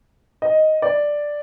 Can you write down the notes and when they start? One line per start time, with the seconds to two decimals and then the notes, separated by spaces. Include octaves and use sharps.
0.42 D#5
0.82 D5